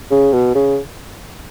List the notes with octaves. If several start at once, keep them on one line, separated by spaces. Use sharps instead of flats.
C#3
B2
C#3